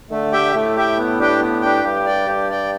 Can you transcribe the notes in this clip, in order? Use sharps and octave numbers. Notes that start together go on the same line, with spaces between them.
D3 A3
G4 E5 G5
A2 A3
G4 E5 G5
B3
D4 G4 B4 G5
B3
D4 G4 B4 G5
G2 G4
D5 G5
G2 G4
D5 G5